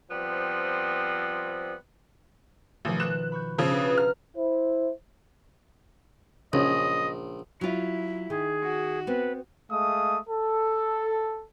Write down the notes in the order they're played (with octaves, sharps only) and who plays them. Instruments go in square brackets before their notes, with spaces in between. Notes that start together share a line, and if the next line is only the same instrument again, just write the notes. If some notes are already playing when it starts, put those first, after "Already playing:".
[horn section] F3 G3 B3 C4
[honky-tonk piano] A1 [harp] B2 D#3 F3
[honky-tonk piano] F#6 E7
[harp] B5 C#6 G6
[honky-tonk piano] C#3 F3 [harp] E6
[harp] D4 F#4 B4
[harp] A#5 [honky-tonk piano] F6
[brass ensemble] E4 C5
[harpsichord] A#1 [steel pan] C#3 C#4 [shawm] D#5
[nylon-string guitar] F#3 F4 [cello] E4
[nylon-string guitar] D#3 [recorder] G#4
[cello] F#4
[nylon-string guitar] B3 C4 [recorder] B4
[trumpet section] G#3 A3 F5 D#6
A4